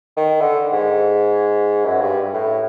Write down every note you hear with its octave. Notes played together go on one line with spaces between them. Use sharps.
D#3
D3
G#2
F#2
G2
A2